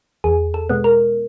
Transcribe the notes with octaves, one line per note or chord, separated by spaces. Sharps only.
E2 G#4
A4
B2 G#3 B3
A#4